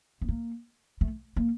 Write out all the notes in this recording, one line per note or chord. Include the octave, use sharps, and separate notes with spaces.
B3
A#3
A3
A#3